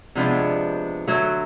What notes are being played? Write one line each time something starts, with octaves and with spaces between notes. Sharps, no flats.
C3 F3 G#3 B3 D4
D3 F#3 A3